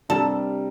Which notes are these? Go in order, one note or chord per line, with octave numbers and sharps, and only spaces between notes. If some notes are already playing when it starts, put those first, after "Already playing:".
C3 G3 D4 G4 A4 A#4